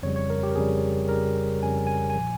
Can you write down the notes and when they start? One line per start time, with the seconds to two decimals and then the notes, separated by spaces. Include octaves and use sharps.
0.03 F2 C#3 G3 C#5
0.16 C#5
0.30 A#4
0.43 G4
0.50 A#4
0.55 F2 C#3 G3 G#4
1.09 F2 C#3 G3 A#4
1.62 F2 C#3 G3 G#5
1.87 G#5
2.10 G#5
2.15 A#2 F3